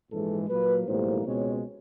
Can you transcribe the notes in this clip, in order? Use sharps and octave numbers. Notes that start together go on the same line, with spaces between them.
A#1 G#2 E3 G#3 A4
A#2 F#3 A#3 B4
B1 A2 E3 G3 A#3 C5
C#2 B2 G#3 C4 C#5